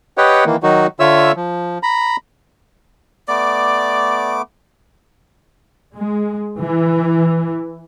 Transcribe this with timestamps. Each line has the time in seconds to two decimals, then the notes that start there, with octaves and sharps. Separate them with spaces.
0.18 G4 B4 C#5 D#5 F#5 G5
0.46 D#3 E3 A#3
0.63 D#3 F#3 D#4 F#4
1.00 D3 F4 C#5 E5 E6
1.36 F3
1.83 A#5 B5
3.29 A3 B3 D5 D6
5.94 G#3
6.61 E3